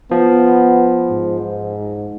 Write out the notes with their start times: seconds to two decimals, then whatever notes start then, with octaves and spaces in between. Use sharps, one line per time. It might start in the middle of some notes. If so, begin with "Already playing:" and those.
0.11 F3 B3
1.10 G#2